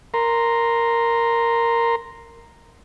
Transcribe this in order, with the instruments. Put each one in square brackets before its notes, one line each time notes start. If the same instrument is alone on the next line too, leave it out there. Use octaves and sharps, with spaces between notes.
[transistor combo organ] A#4 A#5 C6